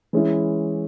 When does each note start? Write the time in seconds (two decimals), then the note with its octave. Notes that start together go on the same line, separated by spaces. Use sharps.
0.13 E3 G#3 C#4 E4